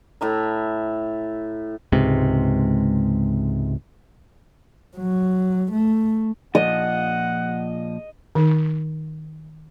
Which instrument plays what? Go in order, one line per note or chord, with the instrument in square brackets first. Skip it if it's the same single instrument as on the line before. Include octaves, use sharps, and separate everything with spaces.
[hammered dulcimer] A2 E5 A#5
[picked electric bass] C#2 G#2 C3
[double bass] F#3
A3
[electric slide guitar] A#2 F3 [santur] D#5 [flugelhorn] F#5
[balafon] D#3 D#4